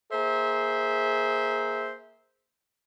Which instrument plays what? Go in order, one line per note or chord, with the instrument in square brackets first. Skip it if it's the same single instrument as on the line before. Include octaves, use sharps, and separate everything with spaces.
[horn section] A#3 G#4 C5 E5